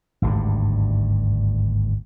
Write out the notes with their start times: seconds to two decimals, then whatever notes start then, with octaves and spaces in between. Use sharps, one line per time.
0.22 G#1 D2 G2